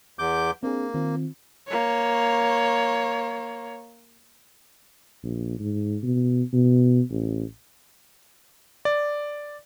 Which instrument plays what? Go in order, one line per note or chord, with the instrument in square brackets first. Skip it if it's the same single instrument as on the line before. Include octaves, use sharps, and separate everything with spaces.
[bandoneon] E2 D6 G6
[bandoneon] A#3 [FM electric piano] C4 D4 G#4
[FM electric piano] D#3 C4 F4
[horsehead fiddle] A#3 C#5
[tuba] A#1
G#2
B2
B2
A1
[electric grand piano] D5